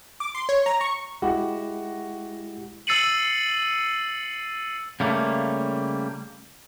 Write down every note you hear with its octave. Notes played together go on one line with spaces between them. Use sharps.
D6
C6
C#5
A#5
C#6
G#3 E4 F#4 G4
E6 A6 C7 C#7 D#7 F#7
C#3 G3 A3 A#3